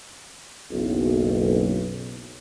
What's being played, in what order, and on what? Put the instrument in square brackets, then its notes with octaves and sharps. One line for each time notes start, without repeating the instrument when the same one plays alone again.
[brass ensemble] F#1 B1